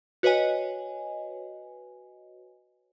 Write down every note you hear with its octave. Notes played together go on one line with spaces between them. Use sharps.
F#4 B4 C#5 D#5 G#5